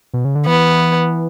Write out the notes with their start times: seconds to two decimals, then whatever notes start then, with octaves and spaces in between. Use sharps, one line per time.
0.14 B2
0.25 C#3
0.35 D3
0.46 E3 B3